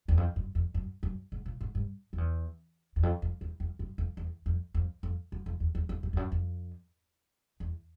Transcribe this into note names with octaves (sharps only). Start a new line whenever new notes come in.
E2
F2
F#2
F2
F#2
F#2
G#2
A#2
G#2
G2
F2
E2
E2
F2
F2
E2
F2
F#2
F2
E2
F2
F2
F2
F#2
F2
E2
E2
F2
F#2
F2
F#2
F2
E2